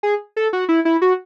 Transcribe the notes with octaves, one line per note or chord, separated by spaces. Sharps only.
G#4
A4
F#4
E4
E4
F#4